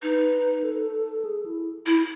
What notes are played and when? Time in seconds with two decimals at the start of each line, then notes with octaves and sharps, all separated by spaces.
0.03 D#4 B4
0.64 A4
1.25 G#4
1.46 E4
1.86 E4